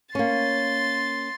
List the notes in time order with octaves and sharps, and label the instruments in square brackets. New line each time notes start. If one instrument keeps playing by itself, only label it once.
[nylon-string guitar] A#3 C#4 [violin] C6 A6